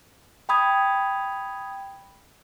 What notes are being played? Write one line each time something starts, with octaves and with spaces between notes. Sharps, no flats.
G5 B5 D#6 G#6